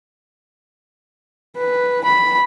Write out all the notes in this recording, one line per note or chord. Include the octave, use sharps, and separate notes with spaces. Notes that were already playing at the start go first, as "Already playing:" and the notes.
B4
B5